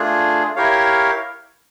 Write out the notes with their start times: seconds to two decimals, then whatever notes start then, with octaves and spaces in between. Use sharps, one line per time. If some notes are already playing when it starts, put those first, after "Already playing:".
Already playing: A3 D4 F4 G#4
0.56 E4 G4 A#4 C#5 F5